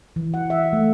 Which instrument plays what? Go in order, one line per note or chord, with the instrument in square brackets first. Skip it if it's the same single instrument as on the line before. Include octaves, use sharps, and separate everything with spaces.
[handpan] E3
F#5
E5
A3